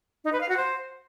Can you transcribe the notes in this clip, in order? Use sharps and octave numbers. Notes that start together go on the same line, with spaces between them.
D#4
B4
F5
F#4
C5